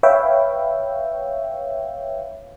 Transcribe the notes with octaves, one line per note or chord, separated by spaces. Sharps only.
B4 C#5 E5 F5 G5